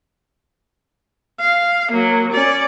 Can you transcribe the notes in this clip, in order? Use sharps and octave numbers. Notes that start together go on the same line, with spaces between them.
F5
F#3 A#3
C#4 D5